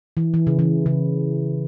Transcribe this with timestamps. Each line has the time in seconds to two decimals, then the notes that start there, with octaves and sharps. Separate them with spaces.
0.17 E3
0.34 E3
0.47 C#3
0.59 E3
0.86 C#3